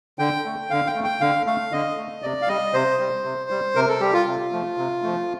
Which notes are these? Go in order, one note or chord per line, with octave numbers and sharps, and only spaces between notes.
D3 G5
A3
D3 F5
G5
A3
G5
D3 F5
A3 F5
D3 D#5
A3
C3 D5
F5
G3 D#5
C3 C5
G3
C3
G3
C3 A#4
A4
G3 G4
F4
C3
F3 A3
C3
F3 A3